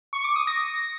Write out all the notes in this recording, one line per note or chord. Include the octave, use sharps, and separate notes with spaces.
C#6
D6
D#6
A#6